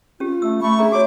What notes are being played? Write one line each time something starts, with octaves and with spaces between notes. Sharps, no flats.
C#4 F4 G4
A3 E6
A3 B5 C#6
D4 G#4 E5 A#5
F#4 C#5 D6